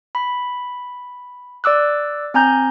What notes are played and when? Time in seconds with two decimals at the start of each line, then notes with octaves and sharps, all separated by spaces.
0.15 B5
1.64 D5 D6 E6 F#6
2.34 C4 G#5 A#5 G6